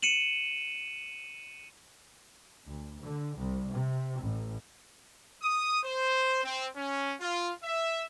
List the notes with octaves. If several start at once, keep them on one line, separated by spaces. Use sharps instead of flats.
C#7 D#7 E7 F#7
D2
D3
C2
C3
A1
D#6
C5
C4
C#4
F4
E5